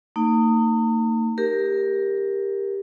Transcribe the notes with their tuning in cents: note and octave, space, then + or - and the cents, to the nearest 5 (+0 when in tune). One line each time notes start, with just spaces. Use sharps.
A#3 -45 D#4 +0
G4 +15 A#4 +5